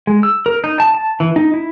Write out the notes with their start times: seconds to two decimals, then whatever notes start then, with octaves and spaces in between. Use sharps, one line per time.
0.07 G#3
0.23 E6
0.46 A#4
0.64 D#4
0.80 A5
0.95 A5
1.20 E3
1.36 D#4
1.54 E4